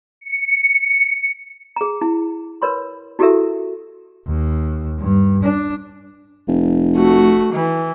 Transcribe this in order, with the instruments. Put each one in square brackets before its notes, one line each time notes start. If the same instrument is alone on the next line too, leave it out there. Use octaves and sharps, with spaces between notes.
[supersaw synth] C#7
[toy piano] G#4 A#5
E4
A#4 B4 C#5 B5 C6
E4 F#4 G4 A4 A#4 E5
[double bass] D#2
G2
D4
[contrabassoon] F1
[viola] A3 F#4
E3